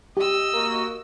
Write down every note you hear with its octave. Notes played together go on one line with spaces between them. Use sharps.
G4 D#5 E6
A#3 F#4